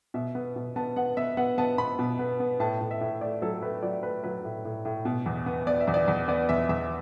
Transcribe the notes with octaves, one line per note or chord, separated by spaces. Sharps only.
B2 E5
B3
B2
B3 A5
B3 F#5
B3 E5
B3 F#5
B3 A5
B3 B5
B2
B3
B3
A2 A5
A2
E5
A2
A3 D5
F#3 A4
A3 B4
F#3 D5
A3 B4
F#3 B4
A2
A2
A2
B2
E2
B3
B3 D5
E5
E2
D5
E2
B3 D5
E2 E5
E2 E5